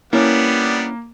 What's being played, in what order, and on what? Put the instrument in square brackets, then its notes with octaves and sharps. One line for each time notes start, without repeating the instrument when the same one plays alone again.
[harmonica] G3 B3 D4 [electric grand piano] A#3 [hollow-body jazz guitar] C#4 E4